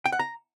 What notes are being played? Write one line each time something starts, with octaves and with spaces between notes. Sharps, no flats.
G5
F#5
A#5